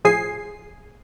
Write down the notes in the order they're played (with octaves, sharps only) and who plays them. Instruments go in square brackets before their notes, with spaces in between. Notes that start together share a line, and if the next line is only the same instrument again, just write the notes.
[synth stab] A2 F3 G#4 G#5 C7